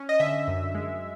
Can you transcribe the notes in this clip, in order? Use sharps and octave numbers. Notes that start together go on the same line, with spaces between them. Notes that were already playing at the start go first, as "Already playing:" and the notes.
Already playing: C#4
D#5
D3 E5
F#2
G#3